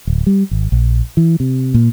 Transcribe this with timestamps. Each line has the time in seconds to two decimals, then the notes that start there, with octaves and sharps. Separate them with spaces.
0.07 D1
0.27 G3
0.51 G#1
0.72 A#1
1.17 E3
1.40 C3
1.74 A#2